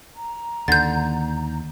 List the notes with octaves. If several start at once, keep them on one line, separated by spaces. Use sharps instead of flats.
A#5
D#2 D3 G6 A6